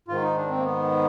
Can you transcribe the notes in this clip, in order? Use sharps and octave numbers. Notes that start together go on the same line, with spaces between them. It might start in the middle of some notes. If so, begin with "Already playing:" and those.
G#2 D#3 F4
D#4
D4
C4
A#3
B3